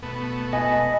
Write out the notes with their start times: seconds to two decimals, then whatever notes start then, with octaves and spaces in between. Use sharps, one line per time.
0.03 B2 A3 B3
0.53 D#5 G#5